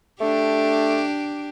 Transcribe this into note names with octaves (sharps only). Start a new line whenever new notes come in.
A3 D4 G4